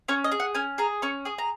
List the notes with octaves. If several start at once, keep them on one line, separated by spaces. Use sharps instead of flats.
C#4 C#5
D#5
G#4
F#5
C#4 G#5
G#4 A#5
C#4 C#6
G#4 D#6
A#5